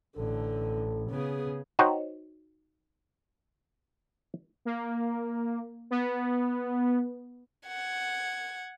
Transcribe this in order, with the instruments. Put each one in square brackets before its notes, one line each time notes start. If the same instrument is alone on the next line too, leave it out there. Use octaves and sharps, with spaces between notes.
[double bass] A1 [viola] D3 [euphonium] A4
[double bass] C#3 [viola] B3 G#4
[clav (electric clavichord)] D#4 F#4 C5 C#5 F#5 G5
[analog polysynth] A#3
B3
[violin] F#5 G#6